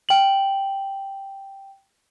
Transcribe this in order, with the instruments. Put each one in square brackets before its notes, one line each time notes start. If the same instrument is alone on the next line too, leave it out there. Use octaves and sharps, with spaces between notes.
[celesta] G5 F#7